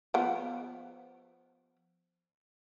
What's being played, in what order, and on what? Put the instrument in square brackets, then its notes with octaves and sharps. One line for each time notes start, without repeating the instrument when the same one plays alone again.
[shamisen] F3 B3